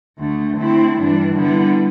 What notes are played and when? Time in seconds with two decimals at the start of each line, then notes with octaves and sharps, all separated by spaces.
0.18 D2 D3 A3
0.57 D3 A3 C4 E4
0.95 G2 E3 G3 D4
1.34 D3 G3 B3 E4